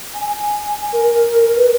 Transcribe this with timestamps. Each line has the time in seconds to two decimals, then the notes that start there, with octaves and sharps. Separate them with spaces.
0.14 G#5
0.30 G#5
0.93 A#4
1.56 B4